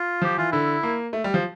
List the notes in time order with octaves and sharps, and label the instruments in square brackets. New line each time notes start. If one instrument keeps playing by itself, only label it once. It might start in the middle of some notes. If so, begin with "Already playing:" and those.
Already playing: [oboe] F4
[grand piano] F3 [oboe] G4
[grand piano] E3 [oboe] F4
[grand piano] D3 [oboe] E4
[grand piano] A#3
A3
G3
F3